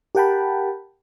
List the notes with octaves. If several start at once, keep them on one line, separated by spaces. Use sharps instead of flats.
G4 A#4 F#5 G5 A5 B5